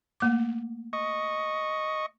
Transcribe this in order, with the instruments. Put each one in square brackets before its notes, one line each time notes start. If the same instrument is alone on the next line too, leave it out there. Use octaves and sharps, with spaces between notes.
[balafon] A3 A#3 D6
[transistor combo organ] D#5 C#6